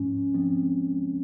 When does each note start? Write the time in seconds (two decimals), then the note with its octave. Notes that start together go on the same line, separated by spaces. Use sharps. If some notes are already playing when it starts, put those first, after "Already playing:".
Already playing: G#2 F3 G#3 C#4
0.34 G#2 F3 G#3 C4